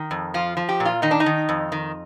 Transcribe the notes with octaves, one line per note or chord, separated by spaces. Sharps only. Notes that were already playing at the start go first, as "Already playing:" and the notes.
Already playing: D#3
F2
F3 F4
F3
G4
A#2
F4
D#3 D#4
D4
D#4
D#3
F2
D#3